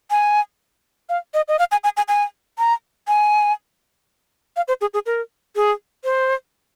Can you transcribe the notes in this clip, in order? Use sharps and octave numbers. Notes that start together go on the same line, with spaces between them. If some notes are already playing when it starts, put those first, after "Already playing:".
G#5
F5
D#5
D#5
F5
G#5
G#5
G#5
G#5
A#5
G#5
F5
C5
G#4
G#4
A#4
G#4
C5